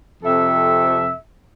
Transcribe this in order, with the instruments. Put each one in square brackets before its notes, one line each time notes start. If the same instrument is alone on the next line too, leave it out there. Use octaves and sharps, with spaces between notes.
[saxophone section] F2 C3 A4 E5